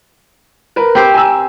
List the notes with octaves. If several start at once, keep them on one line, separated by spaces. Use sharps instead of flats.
A#4 B4
C4 G4 C5
G#5 A#5 E6